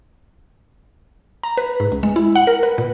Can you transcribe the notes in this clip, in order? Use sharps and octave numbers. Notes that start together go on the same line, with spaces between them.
A#5
B4
G#2
C#2
G#3
E4
F#5
A#4
B4
A#2